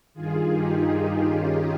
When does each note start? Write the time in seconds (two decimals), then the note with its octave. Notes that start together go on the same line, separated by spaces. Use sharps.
0.14 G2 D#3 F4 G#4
0.51 D#4 G4
1.24 C#4 F4